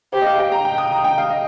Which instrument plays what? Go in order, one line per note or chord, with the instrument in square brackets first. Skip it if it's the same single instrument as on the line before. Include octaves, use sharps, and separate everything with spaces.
[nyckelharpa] G4 [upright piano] C5
[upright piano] D#5
F5
G5
A#5
G5
D#6
A#5
G5
F5
D#5